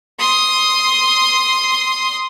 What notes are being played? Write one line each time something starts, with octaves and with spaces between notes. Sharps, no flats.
C6 D#6